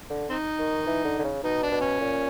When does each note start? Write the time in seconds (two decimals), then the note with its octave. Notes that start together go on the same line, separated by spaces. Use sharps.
0.10 D3
0.29 C4 D#4
0.58 D#3
0.87 E3
1.05 D3
1.19 D3
1.24 C#3
1.43 B2 D#4
1.63 D4
1.71 B2
1.81 C#4
2.00 A#2